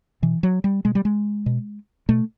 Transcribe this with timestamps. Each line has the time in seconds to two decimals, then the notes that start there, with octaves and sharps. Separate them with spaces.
0.22 B2 E3
0.43 F#3
0.64 G3
0.85 B2 G#3
0.95 G3
1.05 G#3
1.46 B2
2.09 B2 A3